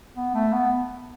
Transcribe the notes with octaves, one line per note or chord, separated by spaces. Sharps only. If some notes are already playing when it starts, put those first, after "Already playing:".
B3
A3
B3